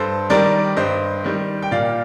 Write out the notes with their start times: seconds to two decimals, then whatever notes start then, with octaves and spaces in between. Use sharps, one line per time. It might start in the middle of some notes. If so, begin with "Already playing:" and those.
Already playing: G2 A4 C5
0.30 D#3 G3 A#4 D5
0.77 G2 C5 D#5
1.24 D#3 G3
1.62 G5
1.71 A#2 D5 F5